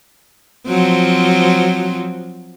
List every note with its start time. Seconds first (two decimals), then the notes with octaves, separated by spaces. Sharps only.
0.67 F3 F#3 C4